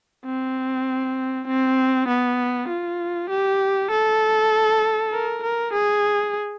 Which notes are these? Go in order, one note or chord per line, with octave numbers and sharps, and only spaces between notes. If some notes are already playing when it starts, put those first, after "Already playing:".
C4
C4
B3
F4
G4
A4
A#4
A#4
G#4